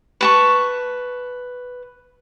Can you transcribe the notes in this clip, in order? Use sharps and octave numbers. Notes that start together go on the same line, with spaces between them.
B4 A5 C#6